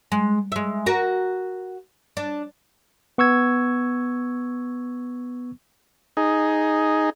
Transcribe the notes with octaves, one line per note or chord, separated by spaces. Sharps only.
G#3
G#3 E5
F#4 A#4
D4
B3 C#6 E6 G#6
D#4 G#4